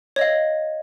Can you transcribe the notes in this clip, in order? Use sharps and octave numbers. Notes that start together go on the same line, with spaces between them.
C#5 D#5 F5